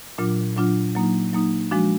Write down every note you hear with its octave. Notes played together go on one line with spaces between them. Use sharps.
A#2 F#3 D4 F4
A#2 F#3 D4 F4
F#3 A#3 D#4
F#3 A#3 D#4
F3 G#3 D4 F#4